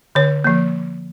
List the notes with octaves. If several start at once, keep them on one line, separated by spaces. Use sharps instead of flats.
D3 C#5
F3 A#3